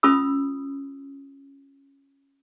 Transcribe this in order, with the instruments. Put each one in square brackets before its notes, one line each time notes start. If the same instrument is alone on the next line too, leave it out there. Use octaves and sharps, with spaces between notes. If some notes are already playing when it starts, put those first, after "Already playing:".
[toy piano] C#4 F4 B5 D#6 E6